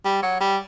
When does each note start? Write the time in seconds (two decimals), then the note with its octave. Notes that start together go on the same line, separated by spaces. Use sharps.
0.05 G3
0.23 F#3
0.41 G3